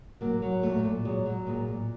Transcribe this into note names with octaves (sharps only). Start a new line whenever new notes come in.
F#3 A#3
F#3
A#2 A3
A#2
F#3 G#3
F#3
A#2 G#3
A#2